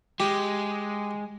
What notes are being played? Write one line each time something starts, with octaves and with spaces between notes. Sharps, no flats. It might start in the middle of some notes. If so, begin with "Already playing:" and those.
G#3 G4